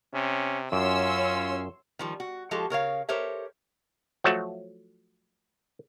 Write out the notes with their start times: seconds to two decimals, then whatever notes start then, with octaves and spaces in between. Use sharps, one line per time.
0.14 C3 C#4
0.72 F#2 C#4 F4 C#5 C6 E6
1.99 D#3 F3 G3
2.20 F#4
2.51 F3 G#3 F#4 G4 A4
2.70 C#3 A#4 C#5 F5
3.09 G4 A4 A#4 C5 C#5 E5
4.24 F3 F#3 A3 F#4